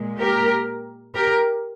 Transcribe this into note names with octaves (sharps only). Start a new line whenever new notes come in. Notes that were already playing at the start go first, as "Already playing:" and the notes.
Already playing: A#2 G#3
G4 A#4
G4 A#4